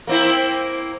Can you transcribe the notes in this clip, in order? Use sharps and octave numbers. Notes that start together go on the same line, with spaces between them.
A#3 C4 E4